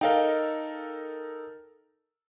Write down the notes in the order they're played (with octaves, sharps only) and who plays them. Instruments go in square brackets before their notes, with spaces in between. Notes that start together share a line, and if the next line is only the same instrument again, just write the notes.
[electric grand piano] D#4 A4 A#4 [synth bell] D#5 F5 G5